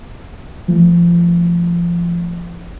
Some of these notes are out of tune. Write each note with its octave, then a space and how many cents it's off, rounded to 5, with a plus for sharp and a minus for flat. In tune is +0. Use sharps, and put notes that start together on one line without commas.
F3 -25 A3 +0